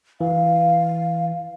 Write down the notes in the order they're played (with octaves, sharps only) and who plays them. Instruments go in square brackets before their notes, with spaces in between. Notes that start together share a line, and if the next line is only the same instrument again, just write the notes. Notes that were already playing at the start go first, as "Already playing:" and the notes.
[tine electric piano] E3 [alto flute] F5